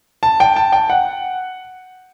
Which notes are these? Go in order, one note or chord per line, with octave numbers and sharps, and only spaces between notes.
A5
G5
A5
G5
F#5